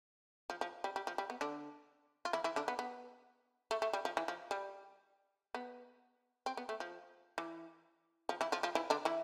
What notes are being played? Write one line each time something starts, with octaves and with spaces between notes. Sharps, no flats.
F3
F3
G3
G3
F3
G3
B3
D3 D4
F4
E3 E4
E3 E4
D3 D4
B3
B3
A3
A3
G3
F3
E3
F3
G3
B3
C4
B3
A3
F3
E3
F3
E3 E4
F3 F4
F3 F4
E3 E4
D3 D4
E3 E4